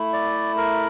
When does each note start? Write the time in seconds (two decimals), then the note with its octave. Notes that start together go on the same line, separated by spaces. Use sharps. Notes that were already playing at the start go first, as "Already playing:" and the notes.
Already playing: A3 E4
0.13 D5
0.57 A#4